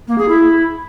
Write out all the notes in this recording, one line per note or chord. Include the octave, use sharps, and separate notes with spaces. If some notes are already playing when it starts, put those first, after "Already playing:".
A#3
G#4
E4